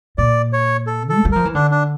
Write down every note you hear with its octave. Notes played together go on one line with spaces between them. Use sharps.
A#2 D5
C#5
A4
A4
A3
G3
F3 A#4
E3
D3 D4
D4